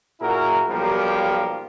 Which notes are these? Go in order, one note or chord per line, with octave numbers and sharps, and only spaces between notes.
A#2 E4 F#4 G#4 A#4
B1 F3 G3 A#3 G4 A#4